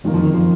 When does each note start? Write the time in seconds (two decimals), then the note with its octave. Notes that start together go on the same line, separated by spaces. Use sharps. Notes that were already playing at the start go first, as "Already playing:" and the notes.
0.04 F#1 F2 D#3 A#3
0.14 F3
0.23 D#3
0.34 F3